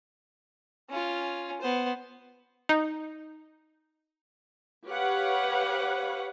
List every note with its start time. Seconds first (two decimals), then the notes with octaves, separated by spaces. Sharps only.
0.90 C#4 F4
1.61 B3 C5
2.69 D#4
4.87 G4 B4 C#5 F5 F#5